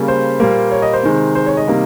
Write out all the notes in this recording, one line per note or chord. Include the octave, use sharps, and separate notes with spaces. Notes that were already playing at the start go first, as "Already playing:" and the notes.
Already playing: C#3 G3 A#3
C5
A#2 G3 A#3
C#5
D#5
C5
C3 D#3 G#3
C5
C#5
D#5
C3 D#3 G3 A#3